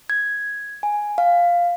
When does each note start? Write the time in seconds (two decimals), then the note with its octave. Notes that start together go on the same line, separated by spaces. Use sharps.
0.10 G#6
0.83 G#5
1.18 F5